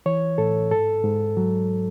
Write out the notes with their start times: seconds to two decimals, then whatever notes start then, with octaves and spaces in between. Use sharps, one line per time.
0.06 E3 C#5
0.38 A2 A4
0.71 G#2 A4
1.04 G#2
1.37 F#3